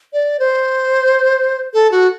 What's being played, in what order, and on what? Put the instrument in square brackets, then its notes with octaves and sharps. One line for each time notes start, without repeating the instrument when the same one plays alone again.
[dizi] D5
C5
A4
F#4